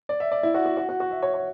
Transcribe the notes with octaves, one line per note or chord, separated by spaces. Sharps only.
D5
E5
D5
E4
F#4
F#4
F#4
F#4
F#4
E5
C#5
C#5